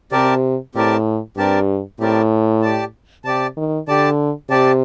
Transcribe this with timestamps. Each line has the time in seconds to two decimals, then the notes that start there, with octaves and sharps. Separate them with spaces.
0.12 C3 C4 G4 A#4 D5 A5
0.75 A2 C4 G4 A#4 D5 A5
1.37 G2 C4 G4 A#4 D5 A5
2.00 A2 C4 G4 A#4 D5 A5
2.62 G4 D5 A5
3.24 C3 G4 D5 A5
3.57 D#3
3.88 D3 G4 D5 A5
4.50 C3 G4 D5 A5